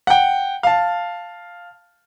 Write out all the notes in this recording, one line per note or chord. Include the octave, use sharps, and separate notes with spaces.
F#5 G5
F5 A5